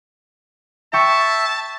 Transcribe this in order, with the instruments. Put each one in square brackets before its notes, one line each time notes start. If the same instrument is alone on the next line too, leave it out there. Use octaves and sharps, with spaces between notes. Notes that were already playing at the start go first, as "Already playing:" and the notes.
[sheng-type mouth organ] E5 [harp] G5 C#6 [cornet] A5